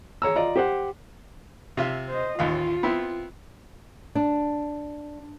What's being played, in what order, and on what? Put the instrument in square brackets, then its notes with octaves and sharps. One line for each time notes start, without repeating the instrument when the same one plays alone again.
[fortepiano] G#4 C#5 A#5 E6
F4 D5 D#5 A#5
G4 C5 F#5
C3 F4 E5
[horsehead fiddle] C5 D#5
[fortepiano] A1 D#2 F5 [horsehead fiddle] F4
[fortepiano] B3 C4 E4
[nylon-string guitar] D4